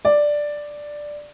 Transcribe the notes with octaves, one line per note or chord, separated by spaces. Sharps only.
D5